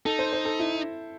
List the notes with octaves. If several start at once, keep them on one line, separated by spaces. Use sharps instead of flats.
D#4 A4
C5
C5
A4
E4